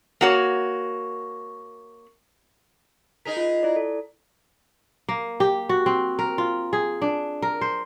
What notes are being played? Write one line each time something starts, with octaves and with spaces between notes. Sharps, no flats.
A#3 F#4 C#5
D#4 G#4 A#4 B6
F4
E4 D5
A4
A#3
G4
F#4
C4
A#4
F4
G#4
D4
A#4
C5